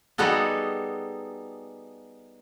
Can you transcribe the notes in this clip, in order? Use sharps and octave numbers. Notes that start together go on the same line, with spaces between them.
G3 B3 D#4 F#4 G#4 A4